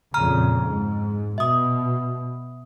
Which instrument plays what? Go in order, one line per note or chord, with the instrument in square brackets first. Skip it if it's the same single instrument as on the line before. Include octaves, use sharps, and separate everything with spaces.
[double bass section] F2 A#2 C#3 [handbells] A#5 F6
[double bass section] G#2
[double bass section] B2 [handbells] E5 D#6